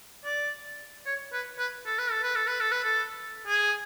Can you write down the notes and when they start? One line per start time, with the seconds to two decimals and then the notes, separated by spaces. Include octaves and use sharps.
0.25 D5
1.06 C#5
1.33 B4
1.59 B4
1.86 A4
1.99 B4
2.11 A4
2.23 B4
2.35 A4
2.47 B4
2.60 A4
2.72 B4
2.84 A4
3.47 G#4